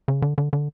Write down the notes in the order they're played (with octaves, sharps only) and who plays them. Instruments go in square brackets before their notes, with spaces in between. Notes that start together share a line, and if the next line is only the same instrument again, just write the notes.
[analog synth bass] C#3
D3
D3
D3